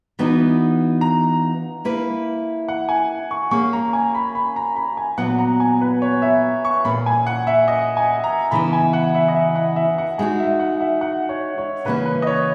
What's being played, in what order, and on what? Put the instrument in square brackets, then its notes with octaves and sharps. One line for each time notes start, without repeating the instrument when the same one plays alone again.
[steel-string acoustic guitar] E3 B3 D#4 F#4
[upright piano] A#5
[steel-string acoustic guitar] A#3 E4 B4
[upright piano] F#5
G#5
C#6
[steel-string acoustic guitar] A#3 C#4 G#4 [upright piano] C#6
[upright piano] A#5
G#5
B5
B5
A#5
B5
G#5
[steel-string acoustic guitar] A#2 F#3 B3 [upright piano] F#5
[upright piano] A#5
G#5
B4
C#5
E5
C#6
[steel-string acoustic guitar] A#2 A#3 C#4 [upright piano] B5
[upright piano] G#5
F#5
E5
D#5
G#5
A#5
[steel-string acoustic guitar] C#3 E3 B3 E4 [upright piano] B5
[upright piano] G#5
F#5
E5
D#5
E5
F#5
E5
F#5
[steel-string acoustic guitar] G#3 D#4 F#4 [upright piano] G#5
[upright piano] E5
F#5
E5
F#5
C#5
C#5
[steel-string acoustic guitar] C#3 E3 A#3 C#4 [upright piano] B4
[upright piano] B4
D#5
C#5